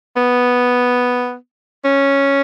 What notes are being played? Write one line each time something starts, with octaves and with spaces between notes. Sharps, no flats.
B3
C#4